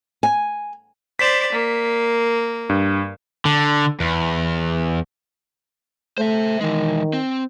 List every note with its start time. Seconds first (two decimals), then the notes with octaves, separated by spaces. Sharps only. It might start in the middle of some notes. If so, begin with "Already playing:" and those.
0.23 G#5
1.19 C5 D5 B6 E7
1.52 A#3
2.69 G2
3.45 D3
4.00 E2
6.18 A3 C5 E5
6.61 D#3 E3 G#3
7.13 C4